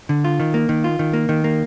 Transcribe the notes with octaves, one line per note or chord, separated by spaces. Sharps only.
D3
F4
D#3
A#3
D#3
F4
D#3
A#3
D#3
A#3